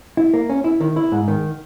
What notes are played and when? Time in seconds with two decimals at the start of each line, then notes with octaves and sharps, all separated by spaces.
0.17 E4
0.34 A#3
0.50 C#4
0.64 E4
0.81 D#3
0.96 E4
1.12 G#2
1.28 D#3